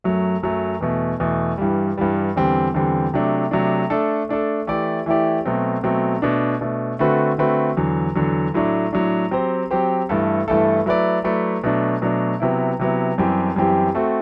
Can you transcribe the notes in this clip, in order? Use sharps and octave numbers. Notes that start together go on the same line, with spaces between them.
F#2 F#3 A3
F#2 F#3 A3
E2 B2 A3
E2 B2 A3
G2 E3 G3
G2 E3 G3
E2 D3 G3 C4
E2 D3 G3 C4
C3 F#3 A3 D4
C3 F#3 A3 D4
A3 D4 A4
A3 D4 A4
E3 A3 E4 G4 D5
E3 A3 E4 G4 D5
B2 F#3 A3 C4
B2 F#3 A3 C4
B2 A3 D4
B2 A3 D4
D3 A3 C4 F#4 B4
D3 A3 C4 F#4 B4
E2 D3 F#3
E2 D3 F#3
A2 F#3 A3 D4
A2 F#3 A3 D4
F#3 C4 G4 C5
F#3 C4 G4 C5
G2 E3 A3 E4 A4
G2 E3 A3 E4 A4
F#3 A3 E4 B4 D5
F#3 A3 E4 B4 D5
B2 F#3 A3 D4
B2 F#3 A3 D4
C3 F#3 B3 E4
C3 F#3 B3 E4
F#2 E3 G3 C4 G4
F#2 E3 G3 C4 G4
A3 C4 F#4 A4